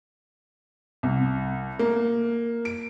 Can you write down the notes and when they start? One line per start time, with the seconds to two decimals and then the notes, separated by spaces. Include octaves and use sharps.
1.03 C2
1.79 A#3
2.65 D7